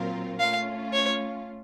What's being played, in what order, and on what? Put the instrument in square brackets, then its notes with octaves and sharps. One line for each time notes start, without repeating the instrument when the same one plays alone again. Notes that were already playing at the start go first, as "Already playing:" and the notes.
Already playing: [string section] A#2 F#3 C4 F4 A#4
[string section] A3 C#4 F4 [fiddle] F5
[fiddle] C#5